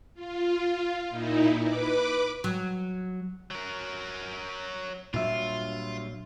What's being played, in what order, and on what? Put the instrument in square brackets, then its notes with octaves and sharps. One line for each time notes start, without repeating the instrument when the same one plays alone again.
[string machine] F4
A#2 D#4 E4
B4 D6
[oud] F#3
[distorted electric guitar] F#3 A#4
[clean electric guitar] G2 E5 [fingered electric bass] A#2 F#3 [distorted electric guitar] F4